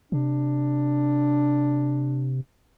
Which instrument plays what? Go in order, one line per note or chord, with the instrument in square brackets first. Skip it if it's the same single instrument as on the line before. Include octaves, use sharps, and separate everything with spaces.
[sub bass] C3 [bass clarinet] D4